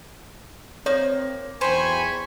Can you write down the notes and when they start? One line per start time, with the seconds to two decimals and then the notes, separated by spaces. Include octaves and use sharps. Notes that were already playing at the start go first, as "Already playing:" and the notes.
0.86 A#3 C4 C#5
1.61 B1 E2 C5 G5 G#5 B5 C#6